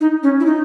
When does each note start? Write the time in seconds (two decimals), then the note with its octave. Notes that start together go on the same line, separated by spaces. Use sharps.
0.01 D#4
0.23 C#4
0.40 E4
0.46 D#4